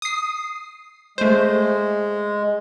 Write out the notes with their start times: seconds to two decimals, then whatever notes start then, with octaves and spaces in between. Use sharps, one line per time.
0.02 D#6 C7
1.18 G#3 A3 C5